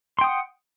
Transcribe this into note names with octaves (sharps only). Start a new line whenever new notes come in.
F#5 G5 C6 D#6